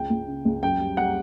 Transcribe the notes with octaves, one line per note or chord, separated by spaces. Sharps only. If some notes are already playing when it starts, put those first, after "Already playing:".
Already playing: C#2 G5
C#2
C#3
C#2
F#2 G5
G3
G3 F#5